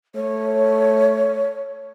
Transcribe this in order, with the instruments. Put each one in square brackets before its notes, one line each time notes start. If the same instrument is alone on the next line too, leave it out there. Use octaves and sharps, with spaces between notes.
[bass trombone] A3 [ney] C#5